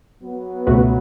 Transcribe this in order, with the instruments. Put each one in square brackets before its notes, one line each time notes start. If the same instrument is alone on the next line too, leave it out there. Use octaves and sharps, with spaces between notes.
[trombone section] F#3 B3
[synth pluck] C#2 B2 A3 F#4 B4